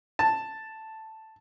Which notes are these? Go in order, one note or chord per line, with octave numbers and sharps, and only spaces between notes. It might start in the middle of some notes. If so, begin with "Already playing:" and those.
A5